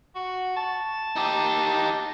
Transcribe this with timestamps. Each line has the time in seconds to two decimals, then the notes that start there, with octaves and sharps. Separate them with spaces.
0.15 F#4
0.56 A5
1.16 D#4 G4